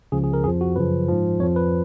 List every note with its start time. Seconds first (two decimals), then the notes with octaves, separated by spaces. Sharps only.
0.12 C#2 C#3 F3 G#4
0.24 G#4
0.33 A#4
0.44 F2 F3 G#4
0.61 F#4
0.76 F#2 C#3 F3 B4
1.08 G#2 F3
1.40 F2 C#5
1.43 F3
1.56 B4